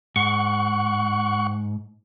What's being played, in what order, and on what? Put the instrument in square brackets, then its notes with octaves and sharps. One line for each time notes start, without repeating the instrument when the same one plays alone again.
[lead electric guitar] G#2 [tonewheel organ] F#5 C#6